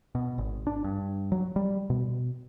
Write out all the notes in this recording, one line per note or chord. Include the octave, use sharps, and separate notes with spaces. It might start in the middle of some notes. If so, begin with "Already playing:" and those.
B2
G#1
D4
G2
F#3
G3
B2